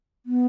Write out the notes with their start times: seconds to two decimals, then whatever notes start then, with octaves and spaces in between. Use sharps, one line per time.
0.26 B3